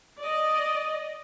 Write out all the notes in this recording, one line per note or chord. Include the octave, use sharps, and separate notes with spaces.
D5 D#5